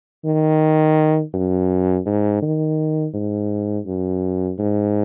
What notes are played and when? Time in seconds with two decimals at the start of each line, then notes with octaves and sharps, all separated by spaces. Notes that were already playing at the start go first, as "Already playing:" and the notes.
0.24 D#3
1.34 F#2
2.06 G#2
2.42 D#3
3.14 G#2
3.86 F#2
4.58 G#2